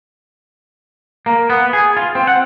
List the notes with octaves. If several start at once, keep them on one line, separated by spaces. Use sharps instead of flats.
A#3
B3
G#4
F4
C4
F#5